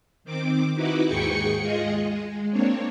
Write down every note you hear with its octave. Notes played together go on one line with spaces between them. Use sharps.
D#3 C4 D6
D#4 E4 F#4 B4 D6
D#2 G#2 G#4 G5 C#6 C#7
G#3 F4 G#4 D#5
G#3
A#3 C4 D4 C#5